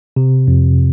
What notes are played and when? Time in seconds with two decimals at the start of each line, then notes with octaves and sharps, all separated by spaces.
0.16 C3
0.48 F2